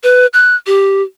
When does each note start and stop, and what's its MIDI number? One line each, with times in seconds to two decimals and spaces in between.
0.04 0.27 71
0.33 0.55 90
0.67 1.02 67